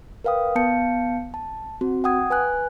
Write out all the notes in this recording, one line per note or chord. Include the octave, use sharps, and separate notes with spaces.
A#4 B4 F5 G5 D#6
B3 F5 A5 G6 C#7
A5
C4 F#4
F#5 G5 D#6 G#6
B4 G#5 F#6